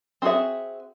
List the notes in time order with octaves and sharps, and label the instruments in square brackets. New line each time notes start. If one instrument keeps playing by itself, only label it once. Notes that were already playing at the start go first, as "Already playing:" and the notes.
[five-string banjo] C4 E4 F#4 G#4 E5